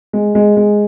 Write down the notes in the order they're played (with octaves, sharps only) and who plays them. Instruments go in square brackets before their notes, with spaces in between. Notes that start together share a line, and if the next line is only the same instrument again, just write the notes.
[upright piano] G#3
G#3
G#3